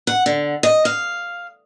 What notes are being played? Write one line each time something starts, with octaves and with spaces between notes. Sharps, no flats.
F#5
D3
D#5
F5